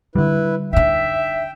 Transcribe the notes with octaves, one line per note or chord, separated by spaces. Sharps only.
D3 G3 E4 B4
D4 D#4 E5 G5